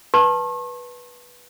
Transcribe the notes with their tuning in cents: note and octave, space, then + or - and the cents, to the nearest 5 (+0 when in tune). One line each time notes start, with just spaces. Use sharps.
B4 -10 A5 +0 C#6 -45